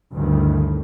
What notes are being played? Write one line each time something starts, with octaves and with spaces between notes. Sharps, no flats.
G1 D2 G2 D#3 E3